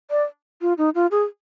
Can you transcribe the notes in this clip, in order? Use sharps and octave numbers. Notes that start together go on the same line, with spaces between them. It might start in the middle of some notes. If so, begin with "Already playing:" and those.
D5
F4
D#4
F4
G#4